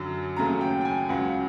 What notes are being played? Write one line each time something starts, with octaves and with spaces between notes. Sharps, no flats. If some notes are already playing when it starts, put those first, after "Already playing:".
Already playing: F#2 D3 F#3
D#2 C#3 F#3 A3 A#5
G5
G5
G#5
C#2 C#3 F#3 F#5